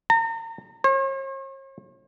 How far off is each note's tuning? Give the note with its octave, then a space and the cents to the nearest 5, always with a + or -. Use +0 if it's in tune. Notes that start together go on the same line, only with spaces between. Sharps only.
A#5 -35
C#5 -45